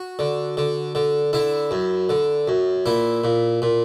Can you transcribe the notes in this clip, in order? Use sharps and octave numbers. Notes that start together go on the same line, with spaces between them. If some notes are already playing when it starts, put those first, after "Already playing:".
Already playing: F#4
D3
D3
D3
D3 E4
F#2
D3
F#2
A#2 E4
A#2
A#2